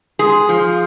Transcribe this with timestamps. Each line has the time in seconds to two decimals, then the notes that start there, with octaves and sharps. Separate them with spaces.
0.19 G#3 G#4
0.49 F3